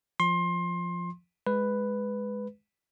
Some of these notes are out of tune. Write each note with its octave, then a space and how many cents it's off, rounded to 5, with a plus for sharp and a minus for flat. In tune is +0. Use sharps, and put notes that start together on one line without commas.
F3 +0 C6 +25
G#3 +0 B4 +5